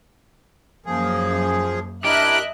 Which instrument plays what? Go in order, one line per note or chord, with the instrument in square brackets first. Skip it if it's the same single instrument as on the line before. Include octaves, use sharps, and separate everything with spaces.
[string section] F#2 A#3 [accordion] F3 G#4
[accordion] D4 E4 A#4 [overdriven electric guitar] G4 [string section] D#5 E5 F#6